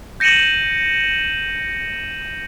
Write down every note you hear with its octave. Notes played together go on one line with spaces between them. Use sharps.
G6 A#6 C#7 D#7 E7 F#7